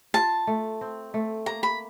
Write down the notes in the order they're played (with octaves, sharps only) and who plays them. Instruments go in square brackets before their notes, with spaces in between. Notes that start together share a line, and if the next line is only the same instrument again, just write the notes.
[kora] F4 [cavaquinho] A5
[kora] A3
C4
A3
[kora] A#3 [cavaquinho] A#5
[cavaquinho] B5